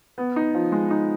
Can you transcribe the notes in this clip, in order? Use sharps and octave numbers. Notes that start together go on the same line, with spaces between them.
B3
D#4
F3
G#3
D#4